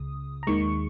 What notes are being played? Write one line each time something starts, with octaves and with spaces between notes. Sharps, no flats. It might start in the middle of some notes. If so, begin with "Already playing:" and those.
Already playing: C#2 C#3 D#6
A#5
D#2 D#3 G#3 C#6